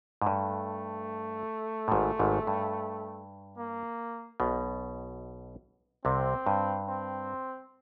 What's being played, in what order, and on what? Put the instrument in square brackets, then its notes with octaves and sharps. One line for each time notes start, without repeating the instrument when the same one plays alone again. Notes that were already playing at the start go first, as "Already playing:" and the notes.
[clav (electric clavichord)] G#2
[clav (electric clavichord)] G2 [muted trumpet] A3
[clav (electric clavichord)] A2
G#1 G#2
G#1 G#2
G2
[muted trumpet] A#3
[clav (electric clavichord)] B1 B2
[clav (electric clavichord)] C2 C3 [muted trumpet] C4
[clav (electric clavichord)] G2
[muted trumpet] C4